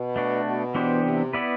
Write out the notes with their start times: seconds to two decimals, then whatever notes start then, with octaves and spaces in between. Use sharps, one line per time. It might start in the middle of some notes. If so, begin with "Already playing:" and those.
Already playing: B2
0.16 A3 D4 F#4
0.45 B2
0.74 E3 B3 D4 G4 C5
1.04 C3
1.33 B3 E4 B4 D5